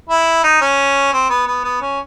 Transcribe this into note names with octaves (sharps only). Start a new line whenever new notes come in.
E4
D#4
C#4
C4
B3
B3
B3
C#4